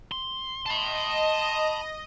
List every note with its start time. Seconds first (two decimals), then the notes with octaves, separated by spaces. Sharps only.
0.12 C6
0.66 D#5 A5 B5